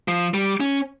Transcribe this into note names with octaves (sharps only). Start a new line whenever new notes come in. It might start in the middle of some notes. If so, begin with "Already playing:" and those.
F3
G3
C#4